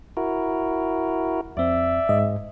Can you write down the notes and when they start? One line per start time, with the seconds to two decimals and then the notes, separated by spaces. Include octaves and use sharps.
0.17 E4 F#4 A#4
1.57 F2 C4 D5 E5
2.09 G#2 D#5